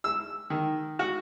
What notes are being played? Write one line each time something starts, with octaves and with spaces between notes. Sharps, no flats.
E6
D#3
F#4